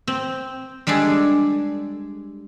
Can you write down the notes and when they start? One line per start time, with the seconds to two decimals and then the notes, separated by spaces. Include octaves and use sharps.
0.08 C4
0.87 G3 G#3 D4 G#4 A4